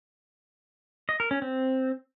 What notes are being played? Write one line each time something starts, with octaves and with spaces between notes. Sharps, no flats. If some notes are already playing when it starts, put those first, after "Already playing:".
D#5
A#4
C#4
C4